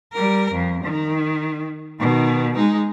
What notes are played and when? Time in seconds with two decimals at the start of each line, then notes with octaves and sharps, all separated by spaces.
0.13 G3 A#4
0.52 F2
0.84 D#3
2.00 B2 D#3
2.56 G#3 D#4